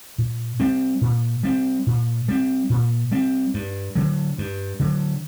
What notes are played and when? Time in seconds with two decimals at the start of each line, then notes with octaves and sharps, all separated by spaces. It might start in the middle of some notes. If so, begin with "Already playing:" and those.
0.18 A#2
0.60 G3 C4
1.01 A#2
1.43 G3 C4
1.87 A#2
2.28 G3 C4
2.70 A#2
3.12 G3 C4
3.54 G2
3.95 D3 F#3
4.38 G2
4.80 D3 F#3